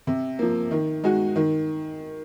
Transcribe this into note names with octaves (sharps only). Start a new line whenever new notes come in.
C3
F3 A#3
D#3
G#3 D#4 F#4
D#3